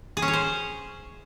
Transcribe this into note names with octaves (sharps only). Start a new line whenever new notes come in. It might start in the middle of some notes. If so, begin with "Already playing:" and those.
G#4
C#4
C#5
C5